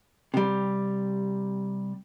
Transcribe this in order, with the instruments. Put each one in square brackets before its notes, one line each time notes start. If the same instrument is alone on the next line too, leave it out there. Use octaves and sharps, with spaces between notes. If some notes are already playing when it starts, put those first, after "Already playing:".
[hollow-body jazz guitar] C3 G3